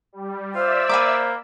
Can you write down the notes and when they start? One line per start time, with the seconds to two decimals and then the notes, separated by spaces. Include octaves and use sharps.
0.13 G3
0.55 F4 C5 D5 E5 E6
0.89 A#3 G#5 B5 D6